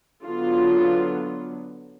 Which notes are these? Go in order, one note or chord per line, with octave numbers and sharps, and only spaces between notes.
D3 F#3 B3 F4